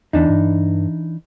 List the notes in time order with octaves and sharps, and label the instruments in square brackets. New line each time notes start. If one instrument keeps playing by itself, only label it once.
[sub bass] E2 [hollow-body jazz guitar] E3 D4 D#4
[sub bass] G2